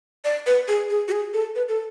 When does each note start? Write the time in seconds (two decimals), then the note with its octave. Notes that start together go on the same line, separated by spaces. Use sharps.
0.25 D5
0.47 B4
0.68 G#4
0.90 G#4
1.08 F#4
1.12 G#4
1.34 A4
1.55 B4
1.68 A4